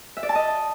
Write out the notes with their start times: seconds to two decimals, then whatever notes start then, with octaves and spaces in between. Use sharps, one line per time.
0.17 E5
0.23 D5
0.29 A5
0.35 D#5